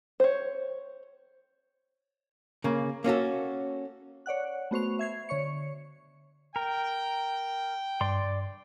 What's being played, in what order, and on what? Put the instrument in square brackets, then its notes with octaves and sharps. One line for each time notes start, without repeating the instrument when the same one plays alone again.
[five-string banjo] C5 C#5
[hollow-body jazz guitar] C#3 A#3
A#3 C#4 F#4 A4
[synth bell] C#5 D5 F#5 F#6
A3 B3 F#4 C5 C#6 F7
E5 G#6 C7
D3 C#5 C#6 C#7
[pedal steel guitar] A#4 [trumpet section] G5
[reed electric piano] G2 [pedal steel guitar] D5 C6